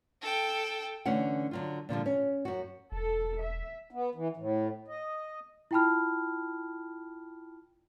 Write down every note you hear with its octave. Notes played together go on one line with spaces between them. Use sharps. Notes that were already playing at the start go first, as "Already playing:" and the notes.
A4 G5
D3 E3 A3 C#4 F#5
D3 F#3 F4
A#2 D3 F3 G3
C#4
F#2 F#4
E1 A4
E5
B3
E3
A2
D#5
E4 F4 G5 A5 B5 F6